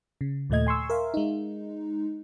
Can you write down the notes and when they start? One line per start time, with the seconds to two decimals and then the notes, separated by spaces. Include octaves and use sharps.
0.21 C#3
0.50 D#2 A#2 A3 D#5 G#6
0.67 G#5 C6 C#6 E6
0.90 A#4 E5 F5
1.14 G#3 D#4